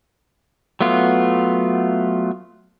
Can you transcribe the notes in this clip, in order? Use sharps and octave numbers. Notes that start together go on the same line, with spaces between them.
F#3 A3 B3 F4